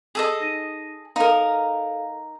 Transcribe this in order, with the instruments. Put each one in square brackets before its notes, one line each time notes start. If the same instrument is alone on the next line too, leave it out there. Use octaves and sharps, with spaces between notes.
[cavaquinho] G#4 A4 D#5
[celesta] D#4 A#6 D#7
[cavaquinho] D#4 A#4 [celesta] A4 F5